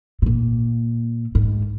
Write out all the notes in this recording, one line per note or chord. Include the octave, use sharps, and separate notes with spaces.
B2
A#2
G#2